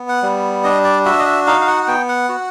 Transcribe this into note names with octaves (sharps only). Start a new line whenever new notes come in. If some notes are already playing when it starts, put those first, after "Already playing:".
Already playing: B3
F#5
G3
D4 D#5
D5
F#4 E5
D#5
E5
D#4 F5
F5
F#5
F#5
B3 G5
F#5
F#4